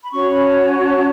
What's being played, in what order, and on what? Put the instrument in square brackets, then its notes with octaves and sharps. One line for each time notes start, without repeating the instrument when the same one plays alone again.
[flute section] B5
C#4 F#4 C#5 C#6
B5
A5
G#5
A5